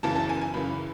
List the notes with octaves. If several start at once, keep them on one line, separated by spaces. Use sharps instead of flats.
F#1 F#2 C#3 E3 A5
A5
G#5
G#5
F#1 F#2 C#3 E3 B5